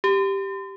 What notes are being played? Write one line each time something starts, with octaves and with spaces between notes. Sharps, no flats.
G4